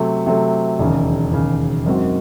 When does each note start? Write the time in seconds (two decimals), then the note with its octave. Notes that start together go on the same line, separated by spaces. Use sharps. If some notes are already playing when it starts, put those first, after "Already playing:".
Already playing: C3 F#3 A3
0.27 C3 F#3 A3
0.79 E1 D#2 C#3
1.32 E1 D#2 C#3
1.86 F#2 D#3 G#3 C4 F#4